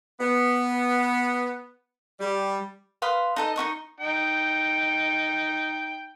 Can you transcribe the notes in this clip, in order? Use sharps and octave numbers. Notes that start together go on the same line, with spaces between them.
B3
G3
B4 F5 C6 D#6
D#4 A4 D#5
D#4 E4 C#6 D#6
D#4 G5